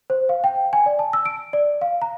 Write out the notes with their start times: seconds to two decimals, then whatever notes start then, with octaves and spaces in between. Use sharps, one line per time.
0.10 C5
0.29 F5
0.44 G5
0.73 G#5
0.86 D5
0.99 A5
1.13 E6
1.26 D7
1.53 D5
1.82 F5
2.02 A#5